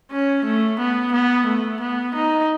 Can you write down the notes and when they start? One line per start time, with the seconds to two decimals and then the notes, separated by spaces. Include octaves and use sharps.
0.11 C#4
0.45 A3
0.79 B3
1.13 B3
1.46 A3
1.81 B3
2.15 D#4